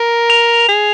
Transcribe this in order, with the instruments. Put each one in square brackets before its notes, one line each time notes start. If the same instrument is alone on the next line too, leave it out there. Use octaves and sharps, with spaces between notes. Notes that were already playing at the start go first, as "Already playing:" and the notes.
Already playing: [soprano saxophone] A#4
[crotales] F7
[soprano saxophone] G#4